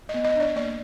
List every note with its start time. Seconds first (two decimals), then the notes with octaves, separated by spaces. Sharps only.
0.09 B3 D#5
0.25 D#5
0.36 D4 D5
0.56 A#3 D5